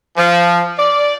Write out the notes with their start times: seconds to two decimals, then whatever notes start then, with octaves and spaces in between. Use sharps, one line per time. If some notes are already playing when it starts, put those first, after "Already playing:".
0.17 F3
0.78 D5